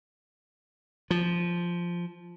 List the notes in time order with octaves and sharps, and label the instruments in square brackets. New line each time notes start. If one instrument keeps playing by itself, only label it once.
[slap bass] F3